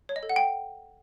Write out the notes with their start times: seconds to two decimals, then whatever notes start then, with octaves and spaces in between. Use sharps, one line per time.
0.09 C#5
0.16 D#5
0.23 A4
0.29 F#5
0.36 G5